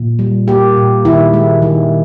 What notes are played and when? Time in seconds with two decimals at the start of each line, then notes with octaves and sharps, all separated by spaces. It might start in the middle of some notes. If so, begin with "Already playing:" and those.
Already playing: A#2
0.19 G3
0.48 A#3 G4
0.77 A#2
1.05 D#3 E4
1.33 G#3
1.62 D#3